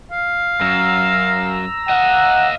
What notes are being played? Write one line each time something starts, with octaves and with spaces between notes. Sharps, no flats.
F5
F#2 A#5 E6
D#5 F5 F#5